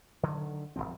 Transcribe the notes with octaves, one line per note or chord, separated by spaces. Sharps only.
D3 D#3 F#3
D#1 F2 F3 C4